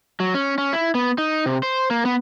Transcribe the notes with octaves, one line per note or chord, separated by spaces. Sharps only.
F#3
C#4
C#4
E4
B3
D#4
C3
C5
A#3
B3